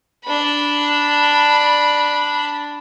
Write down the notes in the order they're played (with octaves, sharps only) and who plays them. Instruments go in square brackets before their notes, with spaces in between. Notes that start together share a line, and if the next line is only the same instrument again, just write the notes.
[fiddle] D4 B5